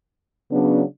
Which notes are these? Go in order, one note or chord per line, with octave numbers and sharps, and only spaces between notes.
C#3 F#3 B3 D4